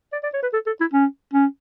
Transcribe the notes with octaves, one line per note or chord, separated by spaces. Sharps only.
D5
D5
C#5
B4
A4
A4
E4
C#4
C#4